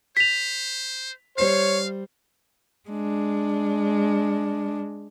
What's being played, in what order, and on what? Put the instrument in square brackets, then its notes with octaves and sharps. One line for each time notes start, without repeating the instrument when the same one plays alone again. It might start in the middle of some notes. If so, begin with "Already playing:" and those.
[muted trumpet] C5 [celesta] B6 F7
[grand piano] G3 C5 C7 [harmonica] C#5 [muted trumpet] F5
[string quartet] G#3 D4